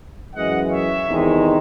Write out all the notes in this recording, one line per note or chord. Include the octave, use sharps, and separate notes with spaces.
F#2 E3 G#3 D#5 F#5
C#5 E5
E2 C3 D#3 G#3 D#4